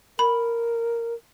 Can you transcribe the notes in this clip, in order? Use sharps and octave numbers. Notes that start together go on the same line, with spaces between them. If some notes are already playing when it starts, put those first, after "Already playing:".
A#4 B5